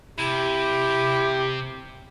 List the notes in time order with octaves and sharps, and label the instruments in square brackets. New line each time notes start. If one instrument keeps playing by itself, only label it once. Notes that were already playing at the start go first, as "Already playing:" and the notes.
[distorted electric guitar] C3 [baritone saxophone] E4 [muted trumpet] G4